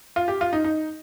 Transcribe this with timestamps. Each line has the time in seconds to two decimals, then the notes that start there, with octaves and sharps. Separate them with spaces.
0.16 F4
0.28 G4
0.41 F4
0.53 D#4
0.64 D#4